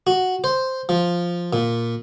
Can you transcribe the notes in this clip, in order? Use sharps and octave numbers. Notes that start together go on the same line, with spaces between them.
F#4
C5
F3
A#2